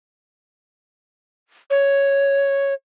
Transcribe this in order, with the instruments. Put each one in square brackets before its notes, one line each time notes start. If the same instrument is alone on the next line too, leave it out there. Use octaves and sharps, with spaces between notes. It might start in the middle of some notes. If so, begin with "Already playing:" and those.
[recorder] C#5